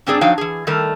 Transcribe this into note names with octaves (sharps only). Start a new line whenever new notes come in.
G#2 C4 D4 G#4 D5
F3 F#3 D#4 F5 G5
E3 G#4
D#3 G3 A3 A#4